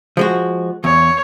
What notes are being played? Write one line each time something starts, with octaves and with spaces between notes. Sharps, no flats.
F3 G#3 F#4
E2 C#5